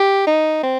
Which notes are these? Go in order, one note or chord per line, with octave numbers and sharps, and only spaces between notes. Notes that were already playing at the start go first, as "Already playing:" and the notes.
Already playing: G4
D#4
C4